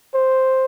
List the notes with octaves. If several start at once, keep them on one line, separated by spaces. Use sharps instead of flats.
C5